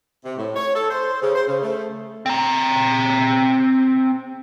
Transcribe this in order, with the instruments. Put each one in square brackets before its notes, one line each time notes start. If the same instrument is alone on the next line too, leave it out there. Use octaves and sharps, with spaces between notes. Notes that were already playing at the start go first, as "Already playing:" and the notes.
[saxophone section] C3
A2
C#5
A4
C5
C#3
C5
C#3
A3
[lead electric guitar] C4 A#5